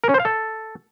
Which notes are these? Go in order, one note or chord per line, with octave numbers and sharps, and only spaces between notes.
A#4
C#4
C5
F5
A4